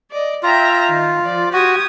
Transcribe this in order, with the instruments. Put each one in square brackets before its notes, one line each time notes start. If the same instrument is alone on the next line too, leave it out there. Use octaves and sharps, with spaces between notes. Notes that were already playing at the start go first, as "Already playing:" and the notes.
[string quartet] D5 D#5
[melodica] F4 [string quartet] E5 G5 A#5
[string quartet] D#3
F3 D5
[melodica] F#4 [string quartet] G4 D#6 G#6